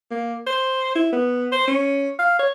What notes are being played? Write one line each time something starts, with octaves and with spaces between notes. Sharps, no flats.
A#3
C5
E4
B3
C5
C#4
F5
C#5